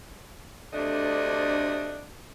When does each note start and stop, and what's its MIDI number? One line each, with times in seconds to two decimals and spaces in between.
0.73 2.05 38
0.73 2.05 48
0.73 2.05 57
0.73 2.05 62
0.73 2.05 75